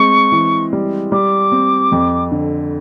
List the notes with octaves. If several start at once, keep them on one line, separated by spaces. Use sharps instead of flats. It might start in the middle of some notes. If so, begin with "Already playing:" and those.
Already playing: G#3 C4 C#6
E3
G3
G3 D6
C4
F2
D3